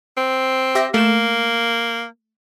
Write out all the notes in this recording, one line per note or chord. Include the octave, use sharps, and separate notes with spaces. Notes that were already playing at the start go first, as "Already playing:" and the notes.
C4
G4 E5 A#6
A3 A#3 E7